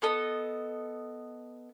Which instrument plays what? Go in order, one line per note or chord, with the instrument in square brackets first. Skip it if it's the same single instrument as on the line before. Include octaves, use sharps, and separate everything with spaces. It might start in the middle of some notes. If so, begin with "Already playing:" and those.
[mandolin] B3 A4 D#5